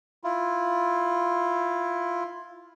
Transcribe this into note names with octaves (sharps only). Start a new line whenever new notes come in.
E4 F4